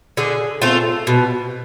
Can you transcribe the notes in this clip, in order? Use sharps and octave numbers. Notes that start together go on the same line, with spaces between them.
D3 G#4
A3 C4 F4
B2